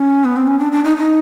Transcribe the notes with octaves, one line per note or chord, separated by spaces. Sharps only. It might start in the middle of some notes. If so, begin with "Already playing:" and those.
Already playing: C#4
B3
C4
C#4
D4
D4
D#4
D#4